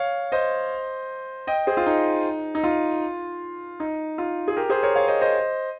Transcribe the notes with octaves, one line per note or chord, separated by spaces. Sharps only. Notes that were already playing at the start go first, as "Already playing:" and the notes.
Already playing: C#5 F5
C5 D#5
D#5 G5
G#4 C5
F4
D#4
D#4
F4
D#4
F4
G#4
G4 A#4
G#4 C5
A#4 C#5
C#5 F5
C5 D#5
C5 D#5